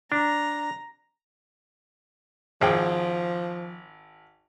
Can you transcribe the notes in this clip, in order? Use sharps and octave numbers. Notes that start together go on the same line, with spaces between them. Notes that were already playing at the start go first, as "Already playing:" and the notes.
D4 A#5
G#1 F3 G#4 G5